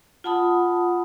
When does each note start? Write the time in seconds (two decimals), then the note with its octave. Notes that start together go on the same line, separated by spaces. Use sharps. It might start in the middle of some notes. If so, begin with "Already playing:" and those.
0.24 F4 F#5 A5 B5 D#6